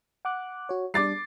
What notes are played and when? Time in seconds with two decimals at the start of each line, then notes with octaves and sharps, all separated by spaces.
0.25 F#5 D6 F#6
0.69 F#4 C#5
0.94 G3 D4 D6 A6 C7